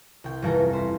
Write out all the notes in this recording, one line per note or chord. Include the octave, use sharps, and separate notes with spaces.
C2 G5
G1 F2 C3 E3 A4 A#5
C5 B5